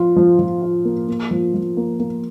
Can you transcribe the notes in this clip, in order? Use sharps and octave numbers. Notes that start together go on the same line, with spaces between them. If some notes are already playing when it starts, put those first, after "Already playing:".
Already playing: F3 F4
F3
F3
F4
A#3
A#3
F3
F3
A#3
A#3